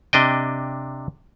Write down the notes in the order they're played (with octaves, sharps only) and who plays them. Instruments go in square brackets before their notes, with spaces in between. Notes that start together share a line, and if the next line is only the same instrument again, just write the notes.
[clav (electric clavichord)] C3 D4 D#5 G5